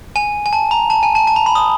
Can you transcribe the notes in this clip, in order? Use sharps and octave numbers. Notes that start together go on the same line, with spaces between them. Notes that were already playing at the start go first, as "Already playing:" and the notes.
G#5
G#5
A5
A#5
A5
G#5
A5
A5
A#5
B5
D#6